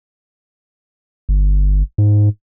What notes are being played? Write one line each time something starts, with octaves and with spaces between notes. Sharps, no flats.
G1
G#2